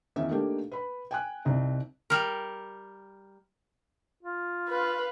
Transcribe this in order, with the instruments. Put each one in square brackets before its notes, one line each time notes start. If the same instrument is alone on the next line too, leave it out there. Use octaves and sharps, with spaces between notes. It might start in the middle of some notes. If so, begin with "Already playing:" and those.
[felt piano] E2 D#3 C#4 E5
A3 A#3 D4 D#4 G4 A4
B4 B5
G5 G#5 F#6
C2 C4 D#4 C5
[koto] G3 A#4
[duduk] F4
[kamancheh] B4 F5